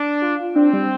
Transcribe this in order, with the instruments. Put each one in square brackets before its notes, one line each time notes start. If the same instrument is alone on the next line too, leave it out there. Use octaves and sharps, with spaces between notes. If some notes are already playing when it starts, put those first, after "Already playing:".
Already playing: [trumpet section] D4
[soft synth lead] F4
[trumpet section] C4 [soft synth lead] D4
[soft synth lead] G3